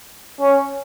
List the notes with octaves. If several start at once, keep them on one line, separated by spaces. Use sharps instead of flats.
C#4